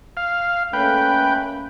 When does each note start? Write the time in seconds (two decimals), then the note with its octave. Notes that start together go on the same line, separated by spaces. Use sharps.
0.17 F5
0.73 A3 A#3 C#4 B4 G5